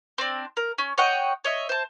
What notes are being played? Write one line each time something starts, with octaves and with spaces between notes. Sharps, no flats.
C4 D4
A#4
C#4
C#5 D#5 F#5 G5
C#5 D#5 E5
C5 A5